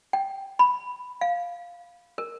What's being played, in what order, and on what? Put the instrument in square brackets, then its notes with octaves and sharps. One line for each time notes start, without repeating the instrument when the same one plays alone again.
[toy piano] G5
B5
F5
A#4